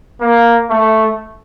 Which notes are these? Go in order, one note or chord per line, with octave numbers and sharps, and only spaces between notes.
A#3
A3